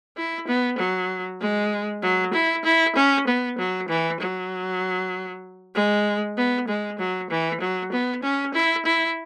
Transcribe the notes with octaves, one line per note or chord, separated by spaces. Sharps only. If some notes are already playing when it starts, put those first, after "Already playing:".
E4
B3
F#3
G#3
F#3
E4
E4
C#4
B3
F#3
E3
F#3
G#3
B3
G#3
F#3
E3
F#3
B3
C#4
E4
E4